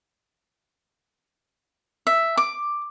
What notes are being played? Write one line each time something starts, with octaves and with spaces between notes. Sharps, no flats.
E5
D6